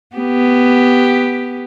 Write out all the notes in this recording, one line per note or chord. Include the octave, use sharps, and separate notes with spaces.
B3 G4